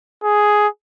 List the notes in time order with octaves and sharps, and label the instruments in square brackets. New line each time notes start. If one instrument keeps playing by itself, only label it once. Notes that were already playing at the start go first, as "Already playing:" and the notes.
[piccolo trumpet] G#4